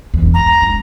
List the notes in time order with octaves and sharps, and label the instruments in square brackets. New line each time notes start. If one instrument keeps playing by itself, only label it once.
[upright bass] F#1 E2
[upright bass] E2 G#3 [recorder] A#5
[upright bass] G#3 D4